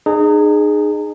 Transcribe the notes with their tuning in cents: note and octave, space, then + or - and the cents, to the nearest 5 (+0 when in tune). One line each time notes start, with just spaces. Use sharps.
D#4 -35 G#4 +0